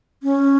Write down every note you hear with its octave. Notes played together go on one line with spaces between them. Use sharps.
C#4